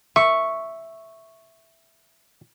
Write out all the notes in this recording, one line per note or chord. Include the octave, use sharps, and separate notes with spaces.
E5 C#6